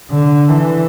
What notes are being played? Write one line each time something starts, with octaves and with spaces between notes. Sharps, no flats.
D3
E3